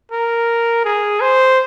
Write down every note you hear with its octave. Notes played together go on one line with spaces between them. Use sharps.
A#4
G#4
C5